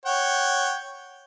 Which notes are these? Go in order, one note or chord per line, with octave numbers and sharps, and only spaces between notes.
C#5 F#5 G5